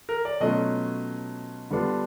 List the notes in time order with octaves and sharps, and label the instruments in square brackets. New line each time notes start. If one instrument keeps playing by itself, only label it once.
[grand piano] A#4
D5
B2 F#3 A3 C#4 F4 D#5
D3 G3 B3 D4 F4